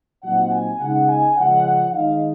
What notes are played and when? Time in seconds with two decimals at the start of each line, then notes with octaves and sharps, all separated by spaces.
0.22 A#2 F#3 C4 D#4 F#5
0.51 G#5
0.79 C#3 G#3 D#4 F#5
1.08 G#5
1.36 C#3 F3 G#3 C#4 F#5
1.93 D#3 G#3 D#4 F5